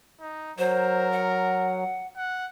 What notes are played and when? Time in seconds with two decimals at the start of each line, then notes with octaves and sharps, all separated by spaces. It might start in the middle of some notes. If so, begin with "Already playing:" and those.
0.21 D#4
0.58 F#3 A#4 C5
1.12 F#5
2.17 F#5